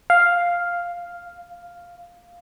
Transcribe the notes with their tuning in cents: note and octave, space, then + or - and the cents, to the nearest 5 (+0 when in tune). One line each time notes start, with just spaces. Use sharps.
F5 +0